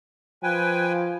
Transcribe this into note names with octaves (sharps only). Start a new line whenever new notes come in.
F3 B4 G5 G#5